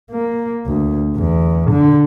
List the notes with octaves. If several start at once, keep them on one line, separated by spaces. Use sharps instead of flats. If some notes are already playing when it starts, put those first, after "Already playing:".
A#3
D2
E2
D3